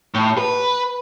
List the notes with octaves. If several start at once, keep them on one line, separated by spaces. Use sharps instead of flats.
A2
B4